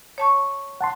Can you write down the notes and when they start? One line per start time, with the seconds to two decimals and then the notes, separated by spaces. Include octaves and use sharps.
0.18 C#5 A5 C#6
0.81 F#5 A5 C6